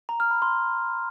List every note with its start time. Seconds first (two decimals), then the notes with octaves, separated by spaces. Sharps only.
0.09 A#5
0.20 F6
0.31 B5
0.42 C6